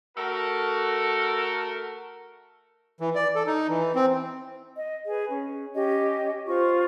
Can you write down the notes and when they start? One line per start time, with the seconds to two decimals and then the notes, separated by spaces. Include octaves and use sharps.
0.17 A3 F#4 A4 A#4
3.00 E3
3.15 D5
3.35 A4
3.47 D#4
3.69 E3
3.95 C4
4.75 D#5
5.07 G#4 B4
5.30 C#4
5.74 C#4 G4 D#5
6.47 F4 C5 C#6